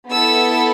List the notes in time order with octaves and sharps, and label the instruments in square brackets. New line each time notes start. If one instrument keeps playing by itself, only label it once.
[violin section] B3 E4 A4 E6